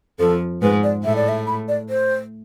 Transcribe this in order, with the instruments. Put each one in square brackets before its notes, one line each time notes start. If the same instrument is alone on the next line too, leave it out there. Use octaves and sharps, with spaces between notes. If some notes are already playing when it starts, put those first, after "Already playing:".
[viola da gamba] F2 F3 [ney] A4
[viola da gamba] G#2 G#3 [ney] B4
[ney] D5
[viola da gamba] A2 A3 [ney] E5
[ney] D5
E5
B5
D5
C5